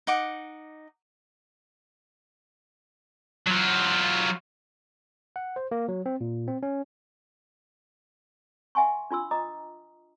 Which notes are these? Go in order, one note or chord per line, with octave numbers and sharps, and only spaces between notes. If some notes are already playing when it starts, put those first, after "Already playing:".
D#4 F#5 D6
F#3 F4
F#5
C5
A#3
F#3
C4
A#2
C4
C#4
E5 F#5 G#5 C6 C#6
D4 F4 C6 E6
D#5 A#5 D6 D#6